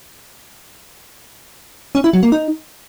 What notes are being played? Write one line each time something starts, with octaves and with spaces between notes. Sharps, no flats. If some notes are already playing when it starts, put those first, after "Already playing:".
C#4
E4
F#3
A#3
D#4